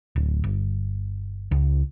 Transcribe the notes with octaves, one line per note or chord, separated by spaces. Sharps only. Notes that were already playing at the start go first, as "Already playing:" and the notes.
D1
G1
C#2